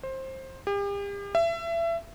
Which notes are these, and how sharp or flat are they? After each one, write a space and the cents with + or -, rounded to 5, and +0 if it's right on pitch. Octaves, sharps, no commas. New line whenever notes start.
C5 +20
G4 +40
E5 +30